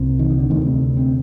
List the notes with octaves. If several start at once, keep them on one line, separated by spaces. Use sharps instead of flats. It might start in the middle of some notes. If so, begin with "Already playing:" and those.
Already playing: C2 C3
D#3
D#3
D3
D2 C3 D#3
C4
C4